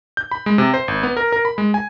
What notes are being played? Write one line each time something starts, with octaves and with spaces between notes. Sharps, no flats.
G6
B5
G#3
C3
C5
G#1
B3
A#4
A#4
B5
G#3
G#5